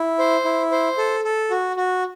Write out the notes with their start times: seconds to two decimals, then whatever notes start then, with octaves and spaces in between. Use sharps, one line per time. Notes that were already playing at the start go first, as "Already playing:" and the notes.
Already playing: E4
0.19 C5
0.45 E4
0.72 C5
0.98 A4
1.24 A4
1.51 F#4
1.76 F#4